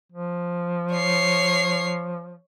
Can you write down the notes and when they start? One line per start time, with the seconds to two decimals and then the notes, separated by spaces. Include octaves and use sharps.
0.12 F3
0.94 C#5 C7